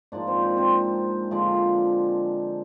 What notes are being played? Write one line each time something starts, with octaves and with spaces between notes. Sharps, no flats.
G#2 F3 A#3 D4 D5
C4 C5
D5
C4 C5
C4 C5
D3 F3 G#3 D4 D5